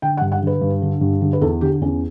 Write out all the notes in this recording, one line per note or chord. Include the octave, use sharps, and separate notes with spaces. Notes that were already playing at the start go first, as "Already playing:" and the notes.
D3 G5
F#5
G2
F#5
D3 B4
G2
D3
G2
D3
B4
E2 A4
D3 G4
E2 C#4